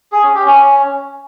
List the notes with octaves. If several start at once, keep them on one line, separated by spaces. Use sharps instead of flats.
G#4
C#4
G4
C#4